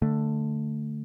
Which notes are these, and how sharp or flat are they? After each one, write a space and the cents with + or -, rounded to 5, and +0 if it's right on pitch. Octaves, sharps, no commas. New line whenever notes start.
D3 +0 A3 +5